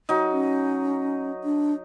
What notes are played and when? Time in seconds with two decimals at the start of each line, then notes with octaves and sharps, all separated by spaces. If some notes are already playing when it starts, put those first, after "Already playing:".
0.09 F#3 D#4
0.32 C#4
1.44 D4